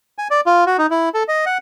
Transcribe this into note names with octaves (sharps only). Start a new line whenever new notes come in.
G#5
D5
F4
F#4
D#4
E4
A4
D#5
F#5